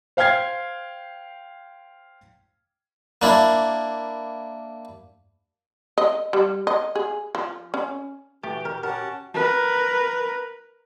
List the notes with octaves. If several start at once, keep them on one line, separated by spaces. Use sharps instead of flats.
C5 F5 G5 F6 G#6 C7
A#3 D4 E4
D#5
G3
D#5
G#4
F3
C#4
E3 A3 F#4 G4
A#4
C#4 A#4 F#5 A5
A#4 B4